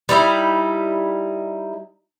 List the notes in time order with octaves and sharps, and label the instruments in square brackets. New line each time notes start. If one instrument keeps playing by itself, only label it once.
[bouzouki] G3 D#4 E4